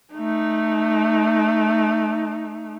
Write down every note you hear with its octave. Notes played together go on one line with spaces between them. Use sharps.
A3 D#4